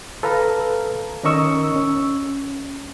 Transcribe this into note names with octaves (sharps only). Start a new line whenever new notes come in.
A4 B4 F5 A#5
D#3 C#4 A#4 D#5 C#6 E6
C#4